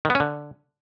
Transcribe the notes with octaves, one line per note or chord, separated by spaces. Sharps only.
D#3
B3
C#4
D3